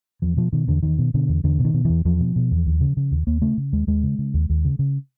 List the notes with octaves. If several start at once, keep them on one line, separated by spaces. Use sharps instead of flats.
E2 F3
B2 F3
B2 D#3
E2 D3
E2 D#3
B2
B2 D3
E2
E2 D3
B2
D#3
B2
E2 E3
E2 F3
B2
B2
E2
D#2
C#3
C#3
D#2
D#2 A#3
C#3 A3
C#3
D#2 G#3
D#2 G#3
C#3
C#3
D#2
D#2
C#3
C#3